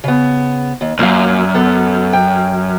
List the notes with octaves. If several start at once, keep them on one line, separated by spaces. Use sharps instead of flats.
C#3 B3
D#2
B1 F#2 A#3 F5
B3 A4
G5